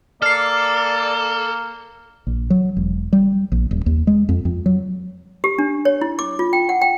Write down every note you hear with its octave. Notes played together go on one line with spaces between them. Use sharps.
A#3 A4 D5 F6 C7
A#1
F#3
E1
G3
A#1
D#1
D#2
G#3
F2
F2
F#3
G4
D4
C#5
E4
D6
F4
G5
F#5
G5